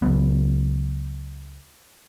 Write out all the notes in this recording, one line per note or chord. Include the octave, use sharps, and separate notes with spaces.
C#2 F#3 B3